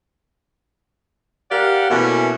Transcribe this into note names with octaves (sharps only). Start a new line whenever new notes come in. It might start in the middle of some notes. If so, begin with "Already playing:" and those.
G4 A#4 D5 F5 F#5
B2 E3 A3 A#3 C#4